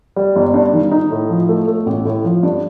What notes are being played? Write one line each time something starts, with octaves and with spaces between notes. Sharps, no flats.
G3
G1
G2
D#3
D#4
A2
F3
A3
A3
A1
A2
F3
G2